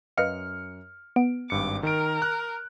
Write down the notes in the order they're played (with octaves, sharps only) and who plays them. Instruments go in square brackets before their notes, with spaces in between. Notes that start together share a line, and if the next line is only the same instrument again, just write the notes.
[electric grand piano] F#2 F6 C#7 [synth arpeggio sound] B4 D#5 F5
[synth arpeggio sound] B3 [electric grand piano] D7
[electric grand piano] G#1 G2 C#7 [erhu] D6
[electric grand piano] D#3 D7 [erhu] A#4
[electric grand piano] F#6